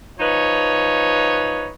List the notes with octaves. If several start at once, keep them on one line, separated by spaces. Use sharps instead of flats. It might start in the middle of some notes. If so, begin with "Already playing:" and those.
F3 D#4 B4 C#5